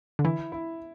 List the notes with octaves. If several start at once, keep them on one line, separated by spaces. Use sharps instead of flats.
D3
E3 E4
E4